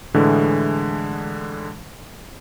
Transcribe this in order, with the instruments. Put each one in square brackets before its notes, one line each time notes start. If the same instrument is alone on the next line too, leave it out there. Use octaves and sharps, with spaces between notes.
[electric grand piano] A2 D3 E3 G#3